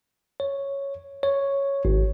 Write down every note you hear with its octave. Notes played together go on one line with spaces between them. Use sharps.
C#5
C#5
G#1